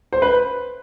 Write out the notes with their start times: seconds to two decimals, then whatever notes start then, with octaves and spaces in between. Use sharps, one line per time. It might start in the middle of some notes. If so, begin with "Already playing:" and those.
0.13 C5
0.22 B4